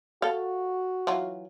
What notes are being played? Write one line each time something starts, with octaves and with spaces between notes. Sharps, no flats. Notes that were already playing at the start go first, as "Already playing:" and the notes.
F#4 A4 F5
E3 F#3 F4